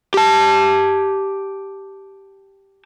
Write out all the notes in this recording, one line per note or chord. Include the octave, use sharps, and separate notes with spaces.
G4 A5